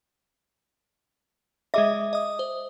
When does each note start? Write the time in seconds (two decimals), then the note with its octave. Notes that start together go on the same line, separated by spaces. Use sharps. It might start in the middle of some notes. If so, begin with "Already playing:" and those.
1.74 G#3 G#4 D#5 E5 D6
2.13 D#5 D#6
2.39 C5